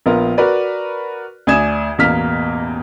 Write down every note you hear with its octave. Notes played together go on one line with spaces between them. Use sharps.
A#1 B3 F4 A#4
F#4 A#4 B4 D5
D2 D5 G#5 D#6 G#6 E7
A1 E2 B2 A#3 F6 B6